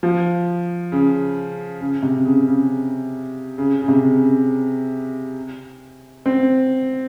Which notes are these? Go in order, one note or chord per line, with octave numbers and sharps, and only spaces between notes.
F3
C#3
C#3
C3
C#3
C#3
C#3
C#3
C3
C#3
C4